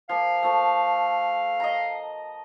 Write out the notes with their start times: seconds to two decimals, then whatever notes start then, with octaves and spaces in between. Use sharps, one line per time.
0.09 F3 A#3 F5
0.43 F3 A3
1.60 D#5 A#5